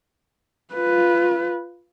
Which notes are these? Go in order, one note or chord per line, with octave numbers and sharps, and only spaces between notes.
F4 B4